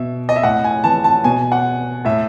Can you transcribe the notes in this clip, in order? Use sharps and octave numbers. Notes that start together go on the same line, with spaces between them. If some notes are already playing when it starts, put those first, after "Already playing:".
Already playing: B2 E5
D#5
E5
A2 F#5
G#5
E3 A5
A5
B2 G#5
F#5
A2 E5